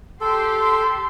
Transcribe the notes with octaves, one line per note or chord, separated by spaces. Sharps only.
G4 A4 C6